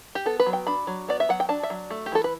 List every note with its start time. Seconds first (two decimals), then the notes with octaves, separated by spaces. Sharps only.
0.15 G4
0.26 B3 A4
0.40 B4
0.46 F#3
0.53 G5
0.67 D4 B5
0.87 F#3
1.08 B3 D5
1.20 E5
1.29 F#3 F#5
1.40 G5
1.49 D4 A5
1.63 E5
1.70 F#3
1.90 A3
2.06 G4
2.12 E3 A4
2.24 B4